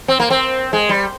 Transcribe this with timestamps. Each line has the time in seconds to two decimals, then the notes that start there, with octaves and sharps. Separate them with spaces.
0.08 C4
0.20 A#3
0.30 C4
0.73 G#3
0.89 G3